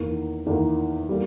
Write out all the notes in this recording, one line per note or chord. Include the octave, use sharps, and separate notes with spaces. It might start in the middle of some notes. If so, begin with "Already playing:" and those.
Already playing: E2 D#3 A#3
E2 D#3 A#3
G3 A#3